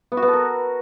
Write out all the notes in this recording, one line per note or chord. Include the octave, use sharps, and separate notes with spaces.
B3
F#4
B3
A4
A#4